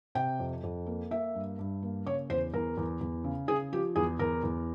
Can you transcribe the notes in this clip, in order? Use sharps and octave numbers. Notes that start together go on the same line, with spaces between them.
C3 G5
F2
F2
A#3
A#3 E5
G2
G2
A#3
C#3 C#5
E2 C5
E2 A#4
E2
E2
C#3
C#3 G#4
F3 G4
E2 G#4
E2 A#4
E2